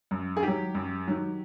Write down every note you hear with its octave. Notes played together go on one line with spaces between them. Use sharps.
F#2
G#4
D#3 F#3 G4
F#2
D#3 F#3